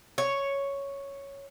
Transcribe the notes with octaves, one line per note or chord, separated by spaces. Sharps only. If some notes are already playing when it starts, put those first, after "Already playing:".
C#5